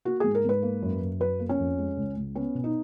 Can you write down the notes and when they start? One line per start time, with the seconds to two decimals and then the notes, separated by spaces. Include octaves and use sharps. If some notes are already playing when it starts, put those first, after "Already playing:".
0.05 A#3 F#4
0.20 G#2 G#4
0.35 A#4
0.44 G#2 B4
0.62 A#3
0.83 F#2
1.01 F#2
1.20 F#3 B4
1.39 A#3
1.49 C#4
1.59 F2
1.78 G#3
1.97 C#2
2.17 C#2
2.35 B3 C#4
2.55 B2
2.64 D#4